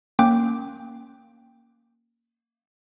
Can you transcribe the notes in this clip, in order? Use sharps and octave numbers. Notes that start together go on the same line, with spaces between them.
A#3 C#4 G5 D6